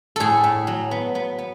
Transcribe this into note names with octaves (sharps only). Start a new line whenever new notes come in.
A2 G#4 A4
A2
F#3
B3
B3
B3